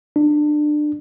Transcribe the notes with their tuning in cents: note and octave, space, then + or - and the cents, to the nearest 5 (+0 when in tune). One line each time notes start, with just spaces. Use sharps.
D4 +25